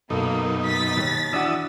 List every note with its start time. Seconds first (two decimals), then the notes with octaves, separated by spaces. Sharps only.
0.10 F#2 B2 A#3 D#4 A4
0.65 A6 B6
0.97 D#2
1.33 E3 D4 F#4 D#6 E6